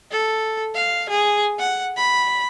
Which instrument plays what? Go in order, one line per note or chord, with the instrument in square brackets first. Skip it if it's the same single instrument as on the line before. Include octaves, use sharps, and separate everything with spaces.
[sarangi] A4
F5
G#4
F#5
B5